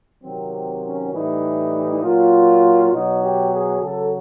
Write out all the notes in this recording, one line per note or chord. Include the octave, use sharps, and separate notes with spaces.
C3 D#3 F#3 C4
C4
C#4
A2 E3 G3 D#4
A#2 F#3 F4
B2 F#3 D#4
G4
G#4
C#3 F#3 A4